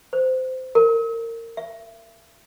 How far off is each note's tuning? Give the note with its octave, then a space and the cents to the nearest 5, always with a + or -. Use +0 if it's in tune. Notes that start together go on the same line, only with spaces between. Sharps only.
C5 -20
A#4 -25
E5 +35